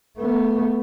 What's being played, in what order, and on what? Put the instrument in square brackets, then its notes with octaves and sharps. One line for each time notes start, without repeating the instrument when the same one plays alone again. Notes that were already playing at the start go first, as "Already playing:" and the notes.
[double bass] A3 B3